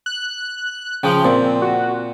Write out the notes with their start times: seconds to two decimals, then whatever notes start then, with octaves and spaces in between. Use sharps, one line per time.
0.06 F#6
1.03 C#3 F3 G5
1.25 A#2 C4
1.62 F#4